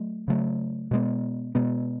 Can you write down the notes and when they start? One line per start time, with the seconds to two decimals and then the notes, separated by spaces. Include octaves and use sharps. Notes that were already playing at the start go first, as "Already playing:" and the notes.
Already playing: F#3 A3
0.28 C#3 F#3 A3
0.91 B2 G#3 B3
1.55 B2 G#3 B3